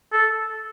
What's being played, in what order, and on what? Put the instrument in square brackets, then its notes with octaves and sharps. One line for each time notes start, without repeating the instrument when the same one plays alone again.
[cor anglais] A4